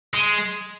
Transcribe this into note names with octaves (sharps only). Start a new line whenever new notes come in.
G#3